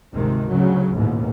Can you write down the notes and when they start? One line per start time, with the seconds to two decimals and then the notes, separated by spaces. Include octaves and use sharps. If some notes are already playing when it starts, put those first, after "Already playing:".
0.12 G#1 D2 C3 D#3 G#3
0.48 D2 C#3 F#3
0.94 A1 D#2 G#2 B2